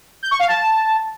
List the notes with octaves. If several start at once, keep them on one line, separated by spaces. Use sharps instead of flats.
G6
C#6
F5
A5